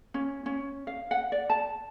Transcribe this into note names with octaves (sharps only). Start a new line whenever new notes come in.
C#4
C#4
F5
F#5
D5
A5